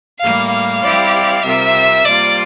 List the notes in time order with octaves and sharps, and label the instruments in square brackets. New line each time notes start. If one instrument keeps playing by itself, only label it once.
[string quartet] A2 G3 A#3 [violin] F5
[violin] F5
[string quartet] G3 C4 E4 G4 D5
[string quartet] C3 G3 C4 F4 A#4 [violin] E5
[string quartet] G3 A#3 F4 C5 [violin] D5